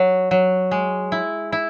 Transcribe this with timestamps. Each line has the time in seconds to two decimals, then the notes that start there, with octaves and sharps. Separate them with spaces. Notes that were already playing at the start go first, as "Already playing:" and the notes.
Already playing: F#3
0.31 F#3
0.71 G#3
1.12 E4
1.52 E4